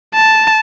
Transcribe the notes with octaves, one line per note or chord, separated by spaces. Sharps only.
A5